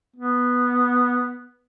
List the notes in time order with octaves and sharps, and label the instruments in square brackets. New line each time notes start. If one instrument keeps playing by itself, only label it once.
[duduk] B3